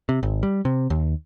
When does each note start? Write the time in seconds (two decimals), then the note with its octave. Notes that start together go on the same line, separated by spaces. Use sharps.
0.09 C3
0.23 G#1
0.43 G3
0.65 C3
0.90 D#2